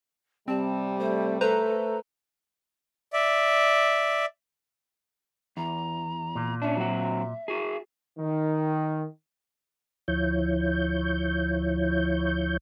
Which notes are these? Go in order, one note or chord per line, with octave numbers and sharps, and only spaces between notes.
C3 G3 C4 A5
A3 C5
A3 A4 B4 C5 A#5
D5 E5
E2 A#5
A#2
C#4 D4 E5
F#3 C4 F#4
F#4 G#4
D#3
D2 F3 E4 C#5 G6